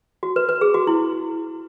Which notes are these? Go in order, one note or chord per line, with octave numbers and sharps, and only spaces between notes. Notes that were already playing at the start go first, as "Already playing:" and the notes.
F#4
B4
B4
G#4
F#4
E4